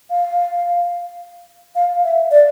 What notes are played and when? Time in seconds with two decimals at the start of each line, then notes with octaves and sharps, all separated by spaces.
0.10 F5
1.76 F5
2.04 E5
2.31 D5